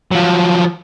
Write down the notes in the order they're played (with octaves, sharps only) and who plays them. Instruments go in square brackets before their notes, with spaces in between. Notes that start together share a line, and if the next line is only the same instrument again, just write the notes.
[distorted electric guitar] F3 F#3